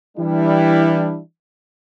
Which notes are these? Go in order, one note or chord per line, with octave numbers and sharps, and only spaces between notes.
E3 G3 D4 E4